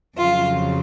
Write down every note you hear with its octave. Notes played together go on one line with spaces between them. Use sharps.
F2 C#3 F#3 F4